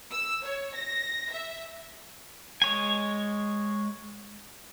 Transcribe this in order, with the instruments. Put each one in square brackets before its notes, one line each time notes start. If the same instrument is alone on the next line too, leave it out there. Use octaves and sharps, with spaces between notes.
[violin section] E6
C#5
A#6
E5
[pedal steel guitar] G#3 C#5 G#5